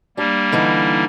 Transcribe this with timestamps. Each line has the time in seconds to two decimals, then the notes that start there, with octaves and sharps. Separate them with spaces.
0.17 G3 A#3 D4 G4
0.52 D3 E3 D#4